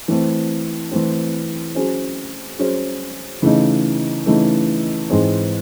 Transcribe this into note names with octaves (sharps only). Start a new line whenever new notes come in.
E3 A3 C4
E3 A3 C4
F#3 C#4 G#4 C5
F#3 C#4 G#4 C5
C#3 E3 A3 D#4
C#3 E3 A3 D#4
G#2 E3 G#3 C4